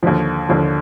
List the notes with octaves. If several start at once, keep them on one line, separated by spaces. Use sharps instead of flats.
D#2 D3 F3
D#2 D3 F3